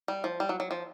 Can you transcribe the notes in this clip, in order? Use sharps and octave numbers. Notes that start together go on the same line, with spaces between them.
G3
F3
G3
F#3
F#3
F3